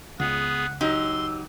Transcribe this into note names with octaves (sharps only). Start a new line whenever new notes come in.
C#2 B3 G#4 F#5
F#3 D#4 G4 C6 E6